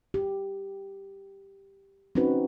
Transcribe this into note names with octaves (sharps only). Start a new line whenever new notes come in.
G4
C4 C#4 D#4 F#4 B4